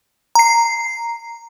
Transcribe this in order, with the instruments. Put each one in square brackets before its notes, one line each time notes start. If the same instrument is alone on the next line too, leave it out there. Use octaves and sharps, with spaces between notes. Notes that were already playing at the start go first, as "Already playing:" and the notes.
[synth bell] A#5 C7